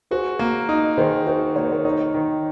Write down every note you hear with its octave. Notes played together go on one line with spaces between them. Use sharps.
F#4 G#4 C5
A#3
D#4
D#3 G#4 C5
F#4 G#4 C5
A#3 C#5
C5
A#4 C#5
D#4 A#4 C#5
D#3